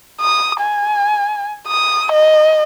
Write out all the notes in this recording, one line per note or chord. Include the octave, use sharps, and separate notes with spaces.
D#6
G#5
D#6
D#5